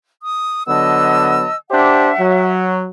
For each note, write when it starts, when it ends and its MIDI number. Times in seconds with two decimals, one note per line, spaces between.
0.23 0.63 87
0.66 1.46 50
0.66 1.46 54
0.66 1.46 59
0.66 1.55 75
0.66 1.55 81
0.66 1.55 88
1.70 2.10 62
1.70 2.10 67
1.70 2.10 72
1.70 2.51 76
1.70 2.51 78
2.18 2.89 54